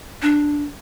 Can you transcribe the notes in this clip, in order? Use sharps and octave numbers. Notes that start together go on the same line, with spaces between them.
D4